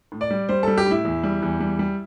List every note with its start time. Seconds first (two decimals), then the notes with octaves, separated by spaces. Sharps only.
0.12 A2
0.21 D5
0.30 G3
0.49 G3 C5
0.63 G3 A4
0.77 G4
0.86 A2 E4
1.05 E2
1.23 G3
1.42 E2
1.60 G3
1.79 G3